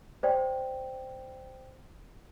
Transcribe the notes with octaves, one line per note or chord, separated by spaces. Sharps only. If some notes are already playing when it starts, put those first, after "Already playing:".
C5 D5 G5